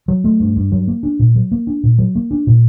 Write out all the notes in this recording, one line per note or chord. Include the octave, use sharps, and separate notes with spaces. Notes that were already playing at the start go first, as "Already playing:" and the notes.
F#3
A3
G2
G2
F#3
A#3
D4
A#2
F#3
A#3
D4
A#2
F#3
A#3
D4
A#2